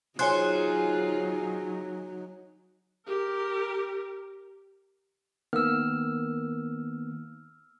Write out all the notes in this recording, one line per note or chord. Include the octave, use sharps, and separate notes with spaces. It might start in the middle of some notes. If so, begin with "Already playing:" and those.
F#3 D#4 F4 G#4 C5 C#5 G#5 F#6
G4 A#4
D#3 A#3 B3 E6 F6